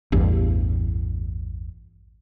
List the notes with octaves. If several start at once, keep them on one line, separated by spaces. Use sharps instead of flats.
A1 E2 G2